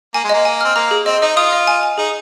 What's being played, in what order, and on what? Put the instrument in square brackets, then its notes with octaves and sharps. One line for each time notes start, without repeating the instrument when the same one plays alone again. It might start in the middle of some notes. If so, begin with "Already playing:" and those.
[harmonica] A#3 [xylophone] G#5
[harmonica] G#3
[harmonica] A#3 [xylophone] D#5
[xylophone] G#5
[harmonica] C4 [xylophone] F6
[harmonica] A#3 [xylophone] A#5
[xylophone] G#4
[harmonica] C4 [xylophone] D#5
[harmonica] D#4 [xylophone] D#5
[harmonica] F4 [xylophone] D#6
[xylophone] D#5
G#5
G#5
[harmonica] D#4 [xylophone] G#4